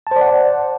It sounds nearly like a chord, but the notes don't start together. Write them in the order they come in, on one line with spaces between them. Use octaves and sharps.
A5 C5 D5 F#5